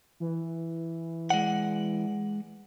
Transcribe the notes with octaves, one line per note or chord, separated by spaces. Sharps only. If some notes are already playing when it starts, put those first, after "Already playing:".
E3
G#3 D5 F#5